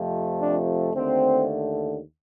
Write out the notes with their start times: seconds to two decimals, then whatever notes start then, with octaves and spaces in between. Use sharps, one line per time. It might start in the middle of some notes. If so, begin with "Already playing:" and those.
Already playing: F2 C3 F3 A3
0.40 D4
0.94 D#2 D3 A3 C4